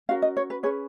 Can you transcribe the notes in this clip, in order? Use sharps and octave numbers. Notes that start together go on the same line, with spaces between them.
C#4 F#4 A#4 F5
D#5
C#5
B4
C#4 G#4 B4 C#5